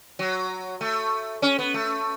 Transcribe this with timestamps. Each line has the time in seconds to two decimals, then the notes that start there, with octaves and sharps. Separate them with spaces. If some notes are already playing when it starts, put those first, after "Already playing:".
0.19 F#3
0.81 A3
1.42 C#4
1.59 B3
1.74 A3